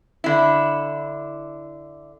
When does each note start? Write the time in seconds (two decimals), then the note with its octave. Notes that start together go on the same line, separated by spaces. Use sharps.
0.24 D3 E4